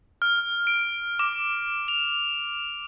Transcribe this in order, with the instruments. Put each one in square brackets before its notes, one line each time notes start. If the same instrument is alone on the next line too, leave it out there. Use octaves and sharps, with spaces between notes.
[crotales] F6
D7
D6
F7